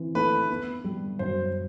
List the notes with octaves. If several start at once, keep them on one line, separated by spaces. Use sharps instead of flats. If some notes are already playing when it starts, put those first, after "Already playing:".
Already playing: E3 C4
A3 B4
B3
G3
F#2 C5